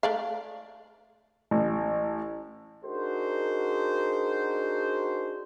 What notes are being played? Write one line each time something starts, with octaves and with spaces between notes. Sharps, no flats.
A3 D5 F5
A1
D4 D#4 F#4 G#4 A#4 C5